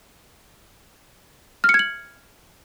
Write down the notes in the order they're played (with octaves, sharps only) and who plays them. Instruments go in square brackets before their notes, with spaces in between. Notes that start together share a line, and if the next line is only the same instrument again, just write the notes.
[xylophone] F6
C#7
G#6
F#7